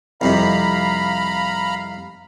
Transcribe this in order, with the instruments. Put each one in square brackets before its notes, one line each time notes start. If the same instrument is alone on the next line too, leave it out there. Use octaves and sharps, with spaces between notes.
[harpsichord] C2 F2 C3 [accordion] F5 A#5 B5